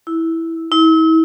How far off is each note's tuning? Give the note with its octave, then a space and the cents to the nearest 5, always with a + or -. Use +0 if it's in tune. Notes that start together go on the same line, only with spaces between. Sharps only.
E4 -5
E4 -40